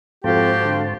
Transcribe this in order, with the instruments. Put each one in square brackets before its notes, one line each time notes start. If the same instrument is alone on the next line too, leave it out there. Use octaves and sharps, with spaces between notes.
[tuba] F2 [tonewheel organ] G#2 C5 A5 [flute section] F#4 F5 G5 [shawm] G4
[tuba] D3